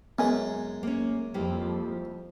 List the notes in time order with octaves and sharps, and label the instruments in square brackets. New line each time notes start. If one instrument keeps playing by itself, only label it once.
[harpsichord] F#2 G#3 [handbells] B3 G#5
[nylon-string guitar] A#3 C#4
[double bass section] F2 F3 [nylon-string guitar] G3 A#3 E4